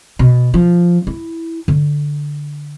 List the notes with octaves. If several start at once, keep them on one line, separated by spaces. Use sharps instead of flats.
B2
F3
E4
D3